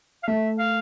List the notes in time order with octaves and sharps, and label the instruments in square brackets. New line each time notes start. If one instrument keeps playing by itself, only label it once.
[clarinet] F5
[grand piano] A3 [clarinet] E5
[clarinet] F5